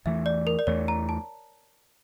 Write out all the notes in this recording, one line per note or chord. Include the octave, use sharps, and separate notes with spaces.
E2 E3 A3 E5
D5
A#4
D5
E2 E3 A3 C#5
A#5
A5